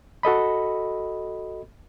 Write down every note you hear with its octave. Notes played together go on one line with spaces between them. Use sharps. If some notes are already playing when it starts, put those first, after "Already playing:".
F#4 A4 D#5 B5